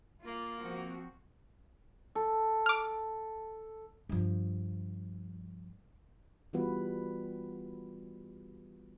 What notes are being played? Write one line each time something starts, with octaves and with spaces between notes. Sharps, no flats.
A#3 F4
F3 C4 F#4
A4
D6 F6
G2 F3
E3 G3 B3 F4 F#4 B4